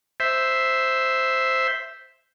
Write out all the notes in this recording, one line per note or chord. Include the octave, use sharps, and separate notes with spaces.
C5 E5